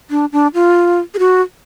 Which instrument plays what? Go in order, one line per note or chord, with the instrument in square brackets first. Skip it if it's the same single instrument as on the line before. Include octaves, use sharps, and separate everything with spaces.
[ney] D4
D4
F4
G#4
F#4